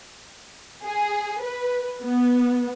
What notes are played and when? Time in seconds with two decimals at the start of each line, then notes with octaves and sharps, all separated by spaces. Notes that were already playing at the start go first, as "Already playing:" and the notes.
0.84 G#4
1.42 B4
2.03 B3